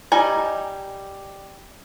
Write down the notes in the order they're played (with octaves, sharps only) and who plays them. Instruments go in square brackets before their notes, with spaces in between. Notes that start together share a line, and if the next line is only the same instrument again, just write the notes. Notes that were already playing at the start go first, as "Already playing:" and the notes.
[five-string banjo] G3 D#4 G#5